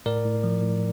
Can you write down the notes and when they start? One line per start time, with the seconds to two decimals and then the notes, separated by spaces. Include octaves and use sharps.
0.06 A2 A#4 D5
0.25 A2
0.44 F3
0.63 A2